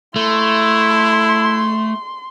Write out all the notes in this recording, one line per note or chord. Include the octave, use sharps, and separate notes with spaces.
A3 E4 C6